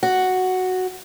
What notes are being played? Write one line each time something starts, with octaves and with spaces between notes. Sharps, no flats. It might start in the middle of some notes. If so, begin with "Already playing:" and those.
F#4